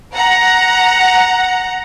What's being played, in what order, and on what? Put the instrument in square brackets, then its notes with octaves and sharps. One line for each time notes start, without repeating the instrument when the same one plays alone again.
[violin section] F#5 A#5